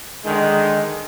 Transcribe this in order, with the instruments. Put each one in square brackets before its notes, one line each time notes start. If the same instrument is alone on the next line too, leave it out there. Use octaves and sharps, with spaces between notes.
[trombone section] D3 D#3 G#3